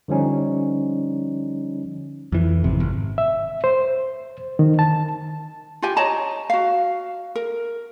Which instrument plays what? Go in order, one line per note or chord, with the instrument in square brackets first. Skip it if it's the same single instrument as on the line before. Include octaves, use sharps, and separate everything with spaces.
[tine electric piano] D3 F3 G3 C#4 D#4
[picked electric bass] F2 E3
G#1 C3
G#1
[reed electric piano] E5
C5
D#3
A5
[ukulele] F4 G4 G#5
C#5 D#5 A5 A#5
F#4 F5
A#4